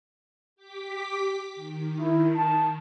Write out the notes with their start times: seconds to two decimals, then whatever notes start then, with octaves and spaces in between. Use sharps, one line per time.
0.56 G4 D6 B6
1.55 D#3
2.00 E4
2.36 A5